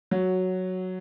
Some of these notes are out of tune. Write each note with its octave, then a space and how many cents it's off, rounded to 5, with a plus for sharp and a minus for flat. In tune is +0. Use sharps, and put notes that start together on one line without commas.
F#3 +0 F#4 -10